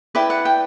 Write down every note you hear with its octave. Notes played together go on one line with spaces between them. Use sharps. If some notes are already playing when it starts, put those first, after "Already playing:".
E4 B4 D5 G5
F#5
G5